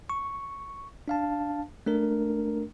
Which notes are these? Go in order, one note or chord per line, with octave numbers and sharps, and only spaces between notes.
C#6
D4 F5 A5
A3 D4 A#4